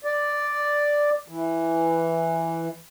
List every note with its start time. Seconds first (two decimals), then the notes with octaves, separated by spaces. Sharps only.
0.05 D5
1.28 E3